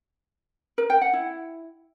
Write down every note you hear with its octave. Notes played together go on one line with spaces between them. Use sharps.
A#4
G5
F#5
E4